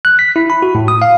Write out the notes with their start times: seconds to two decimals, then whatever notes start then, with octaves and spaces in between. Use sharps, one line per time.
0.05 F#6
0.19 B6
0.36 E4
0.50 B5
0.62 F#4
0.75 A2
0.88 D#6
1.02 F5